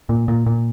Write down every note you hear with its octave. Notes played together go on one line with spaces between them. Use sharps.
A#2
A#2
A#2